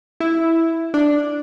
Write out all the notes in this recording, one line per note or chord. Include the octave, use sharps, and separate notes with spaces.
E4
D4